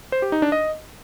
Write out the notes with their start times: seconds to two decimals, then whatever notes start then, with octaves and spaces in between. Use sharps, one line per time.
0.12 C5
0.22 G4
0.32 D#4
0.42 D4
0.52 D#5